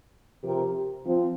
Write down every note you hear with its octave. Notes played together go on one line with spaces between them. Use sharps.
C3 F3 C4 G4 A#4
F3 C4 F4